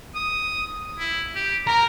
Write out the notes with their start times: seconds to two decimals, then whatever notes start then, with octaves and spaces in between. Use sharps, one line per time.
0.15 D#6
0.99 E4
1.36 G4
1.67 A#4 A#5